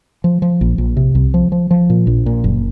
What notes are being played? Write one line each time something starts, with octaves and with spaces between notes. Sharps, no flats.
F3
F3
A#1
A#1
C3
C2
F3
F3
F3
A#2
A#1
A#2
F#1